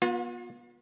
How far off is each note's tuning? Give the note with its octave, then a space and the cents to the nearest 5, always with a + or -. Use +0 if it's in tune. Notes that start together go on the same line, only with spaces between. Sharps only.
B3 -30 F4 +35